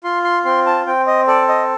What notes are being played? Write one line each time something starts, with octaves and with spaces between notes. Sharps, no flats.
F4 C6
C6
C4 C6
A5
C4 G5
D#5
A4 D5
D#5